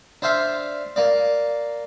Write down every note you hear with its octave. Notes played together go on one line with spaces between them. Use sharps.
D4 C5 E5 F5
A#3 D5